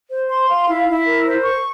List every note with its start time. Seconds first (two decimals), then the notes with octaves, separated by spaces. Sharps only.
0.10 C5
0.29 C6
0.49 F5
0.68 E4
0.87 E4
1.06 A#4
1.25 C5
1.44 C#6